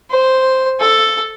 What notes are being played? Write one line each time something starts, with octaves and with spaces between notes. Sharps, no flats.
C5
A4